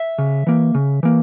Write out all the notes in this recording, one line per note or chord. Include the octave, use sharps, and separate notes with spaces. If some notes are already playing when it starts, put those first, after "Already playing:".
Already playing: E5
C#3
E3 A#3
C#3
E3 A#3